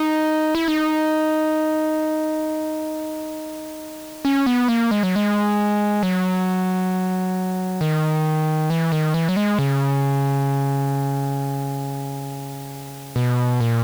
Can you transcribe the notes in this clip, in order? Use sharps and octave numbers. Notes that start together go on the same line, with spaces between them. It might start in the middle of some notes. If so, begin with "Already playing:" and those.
Already playing: D#4
E4
D#4
C#4
B3
A#3
G#3
F#3
G#3
F#3
D#3
E3
D#3
E3
F#3
G#3
C#3
B2
A#2